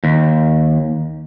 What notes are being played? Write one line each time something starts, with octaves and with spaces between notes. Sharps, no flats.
D#2